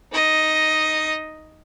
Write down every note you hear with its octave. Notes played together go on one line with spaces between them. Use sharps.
D#4 D#5